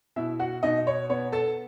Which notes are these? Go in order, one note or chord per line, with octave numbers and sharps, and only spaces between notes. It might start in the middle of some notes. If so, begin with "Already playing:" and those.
B2 E4 E5
F#4 F#5
B2 D#4 D#5
C#5
B3 C#5
A4 A5